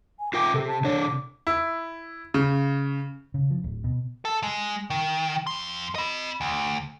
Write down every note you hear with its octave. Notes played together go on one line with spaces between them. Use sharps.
G#5
F4 A#4 G5 D6
C3 A4
A5
C3 D4 C#5
D6
E4
C#3
C#3
F3
D1
B2
A4
G#3
D#3
F2 C6
D#5 B5
D2